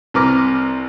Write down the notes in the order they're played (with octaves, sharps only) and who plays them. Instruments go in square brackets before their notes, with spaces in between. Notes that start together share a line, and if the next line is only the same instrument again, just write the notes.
[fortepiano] C2 C3 B4 A#5 D6 F6